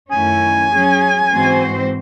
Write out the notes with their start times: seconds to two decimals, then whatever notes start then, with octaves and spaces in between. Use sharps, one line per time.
0.11 F#2 D#3 A3 C#4 E4 G#5
0.72 F#3 C#4 G#4
1.32 G#2 E3 C4 F#4 C5